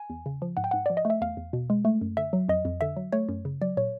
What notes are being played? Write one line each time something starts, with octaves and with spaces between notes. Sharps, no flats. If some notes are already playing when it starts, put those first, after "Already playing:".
Already playing: G#5
E2
C#3
F3
G#2 F#5
G5
G#2 F#5
F3 D5
D#5
A3
E5
E2 F5
E2
B2
G#3
A3
F#2
D3 E5
F#3
F2 D#5
F2
D3 E5
F#3
A3 C#5
F#2
C#3
F#3 D5
A#2 C#5